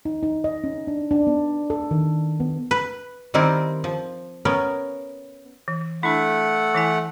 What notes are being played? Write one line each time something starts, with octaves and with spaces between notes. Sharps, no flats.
D#4
D#4
D#5
C#4
D4
D4
B3
A4
D#3
B3
B4
D#3 G3 C4 E4 A#4
F3
B3 C#4 A#4
E3
A3 D4 E4 F#5
E3 E4 G#5